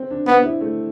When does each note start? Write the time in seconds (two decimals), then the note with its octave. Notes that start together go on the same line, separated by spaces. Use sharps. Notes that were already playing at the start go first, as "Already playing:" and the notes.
Already playing: C4
0.11 D4
0.27 B3 D4
0.44 E4
0.61 A3